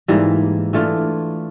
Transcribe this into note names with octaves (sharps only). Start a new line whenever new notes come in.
G#2 E3 G3 A#3
E3 A3 D4 F4